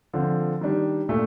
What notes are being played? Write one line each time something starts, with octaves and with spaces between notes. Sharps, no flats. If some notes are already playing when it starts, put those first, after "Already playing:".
D3 F3 C4
D#3 G3 D4
A#2 A3 D4